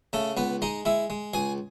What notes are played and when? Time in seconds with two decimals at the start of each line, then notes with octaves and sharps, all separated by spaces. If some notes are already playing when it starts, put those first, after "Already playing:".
0.13 C#3 A3 A4
0.37 C#2 B3 B4
0.62 G#3 D#4 D#5
0.85 G#3 E4 E5
1.10 G#3
1.33 C#2 G#4 G#5